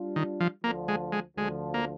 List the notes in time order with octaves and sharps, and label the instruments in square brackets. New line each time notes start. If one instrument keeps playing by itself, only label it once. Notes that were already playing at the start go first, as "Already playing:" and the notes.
Already playing: [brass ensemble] G3 D4 F4
[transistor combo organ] D#3
F3
[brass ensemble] D2 D3 F3 [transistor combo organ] A#3
[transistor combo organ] G#3
G#3
[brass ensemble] D2 D3 F3 [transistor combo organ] G#3
[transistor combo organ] A#3